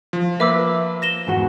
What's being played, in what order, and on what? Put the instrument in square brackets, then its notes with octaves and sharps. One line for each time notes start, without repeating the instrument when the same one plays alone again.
[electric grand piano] F3
[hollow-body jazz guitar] A#3 B4 [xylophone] E5 D6 E6
[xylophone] A#6 E7 G7
[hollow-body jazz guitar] E2 G#2 F#4